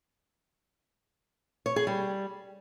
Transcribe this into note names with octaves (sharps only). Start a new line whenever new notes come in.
C#5
G#4
G3